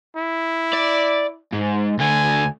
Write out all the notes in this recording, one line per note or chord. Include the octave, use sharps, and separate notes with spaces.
E4
D5
G#2
D2 D3 G#5